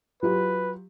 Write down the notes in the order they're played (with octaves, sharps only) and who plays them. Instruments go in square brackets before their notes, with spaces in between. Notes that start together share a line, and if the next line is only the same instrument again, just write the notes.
[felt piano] F#3 F4 G4 [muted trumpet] B4